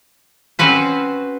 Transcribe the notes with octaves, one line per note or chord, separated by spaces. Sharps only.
C4 C#4 F#4 B4 C5